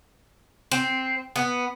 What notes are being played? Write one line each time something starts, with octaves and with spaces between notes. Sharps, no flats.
C4
B3